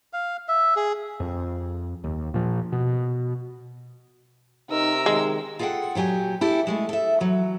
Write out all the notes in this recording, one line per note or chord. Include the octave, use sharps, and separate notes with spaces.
F5
E5
G#4
F2
D#2
A#2 F3
B2
C3 D#4 A#4 E6
D#3 G#3
F4 G#4 A4 E5 F#5 G5
A#2 F#3 G4 G#4 G#5
E4 G4 A4
G#3 A3 B3
A4 E5
E3 F#3